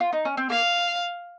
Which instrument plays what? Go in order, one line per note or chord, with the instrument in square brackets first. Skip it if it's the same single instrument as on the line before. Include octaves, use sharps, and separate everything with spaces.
[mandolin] F4
D#4
C#4
C4
[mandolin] A#3 [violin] F5